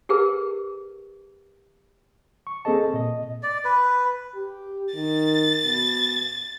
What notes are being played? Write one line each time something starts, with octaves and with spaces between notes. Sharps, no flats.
G4 G#4 A#4 B4
C#6
A#3 C4 G#4 A4 D#5 A5
A#2 D#5
D5
B4
G4
D#3 A6
B2